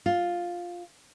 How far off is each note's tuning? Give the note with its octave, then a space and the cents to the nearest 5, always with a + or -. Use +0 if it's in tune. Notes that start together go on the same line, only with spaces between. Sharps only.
F4 +5